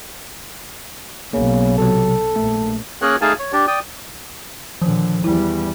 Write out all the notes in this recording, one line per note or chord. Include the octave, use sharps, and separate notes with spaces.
B1 C#3 A#3
C3 F#3 A4
A#1 A3
A#3 C#4 G#4 A#4 C#5 F#6
A3 D#4 G#4 F5 G#5 A5
C#5
D4 G4 D5
D5 G5 D#6
A#2 D3 D#3 F3
E2 G3 E4